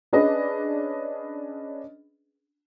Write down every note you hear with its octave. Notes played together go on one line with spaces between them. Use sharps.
C#4 D4 G#4 B4 D#5